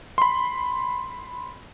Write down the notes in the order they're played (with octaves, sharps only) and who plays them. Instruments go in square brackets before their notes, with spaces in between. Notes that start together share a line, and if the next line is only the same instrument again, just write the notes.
[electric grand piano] B5 C6